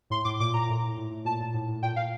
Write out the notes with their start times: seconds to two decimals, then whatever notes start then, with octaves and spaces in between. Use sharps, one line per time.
0.10 A2 C6
0.25 A2 D6
0.40 A#2 D6
0.54 A#2 A#5
0.69 A2
0.83 A2
0.97 A2
1.10 A2
1.25 A#2 A5
1.40 A#2
1.54 A2
1.68 A2
1.82 A#2 G5
1.96 A#2 F5